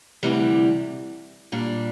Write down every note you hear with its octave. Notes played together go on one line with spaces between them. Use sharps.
D2 C3 E3 G3
A#2 G3 D4